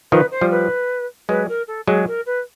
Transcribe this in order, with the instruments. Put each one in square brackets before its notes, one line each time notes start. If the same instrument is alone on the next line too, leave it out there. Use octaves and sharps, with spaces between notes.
[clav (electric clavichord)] D#3 F3 [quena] B4
[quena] C5
[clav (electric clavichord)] F3 G3
[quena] B4
[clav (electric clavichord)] F#3 G#3 [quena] B4
[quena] A#4
A4
[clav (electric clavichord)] F#3 G#3 [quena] G#4
[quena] A#4
B4